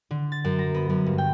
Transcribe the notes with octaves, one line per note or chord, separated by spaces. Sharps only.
D3
A6
F#2
A#5
B3
F#2
G2
G5